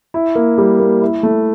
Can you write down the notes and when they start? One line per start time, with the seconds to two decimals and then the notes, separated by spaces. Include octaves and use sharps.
0.14 E4
0.35 A#3
0.58 G3
0.79 A#3
1.02 E4
1.23 A3